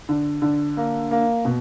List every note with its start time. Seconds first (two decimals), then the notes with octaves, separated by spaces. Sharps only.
0.09 D3
0.42 D3
0.77 A#3
1.11 A#3
1.45 B2